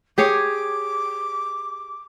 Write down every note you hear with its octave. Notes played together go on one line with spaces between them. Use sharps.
G4 G#4 C#5 D6